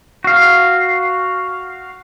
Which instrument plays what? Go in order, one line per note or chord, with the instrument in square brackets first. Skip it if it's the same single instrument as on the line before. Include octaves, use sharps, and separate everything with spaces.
[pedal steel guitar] F#4 F5